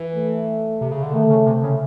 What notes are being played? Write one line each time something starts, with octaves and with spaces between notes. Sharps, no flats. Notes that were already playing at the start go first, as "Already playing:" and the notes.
Already playing: E3
A3
C3
C#3
D3
D#3 A3
C#3
C3
C#3